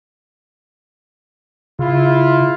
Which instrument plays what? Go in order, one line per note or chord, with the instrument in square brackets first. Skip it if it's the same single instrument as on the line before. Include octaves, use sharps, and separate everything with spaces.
[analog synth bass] C#3 [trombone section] E4 F4